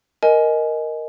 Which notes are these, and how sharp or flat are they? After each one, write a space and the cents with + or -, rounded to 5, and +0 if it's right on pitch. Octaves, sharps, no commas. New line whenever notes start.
A#4 +0 D#5 +0 G#5 +15